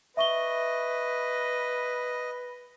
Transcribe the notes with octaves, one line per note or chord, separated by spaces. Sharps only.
B4 D#5 E5 C#6 G7